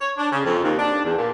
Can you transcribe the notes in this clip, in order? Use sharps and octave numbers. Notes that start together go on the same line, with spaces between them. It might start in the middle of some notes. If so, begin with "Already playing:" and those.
C#5
D4
C#3
F2
D#2
D4
E2
A#2